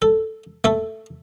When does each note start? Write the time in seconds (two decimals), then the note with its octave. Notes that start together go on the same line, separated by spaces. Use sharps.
0.02 A4
0.64 A3 A4